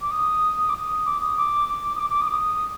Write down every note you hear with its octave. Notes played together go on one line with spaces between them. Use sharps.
D6
D#6
D6
D#6
D6
D#6
D6
D6
D#6
D6
D6
D#6
D6
D#6